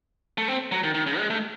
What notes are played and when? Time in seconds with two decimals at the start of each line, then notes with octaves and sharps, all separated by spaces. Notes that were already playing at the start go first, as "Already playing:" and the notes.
0.38 A3
0.48 C4
0.72 F#3
0.83 D#3
0.94 D#3
1.06 C#3
1.18 G#3
1.30 A3